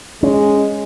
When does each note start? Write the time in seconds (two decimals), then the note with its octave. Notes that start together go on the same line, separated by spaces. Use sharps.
0.23 G#3 C#4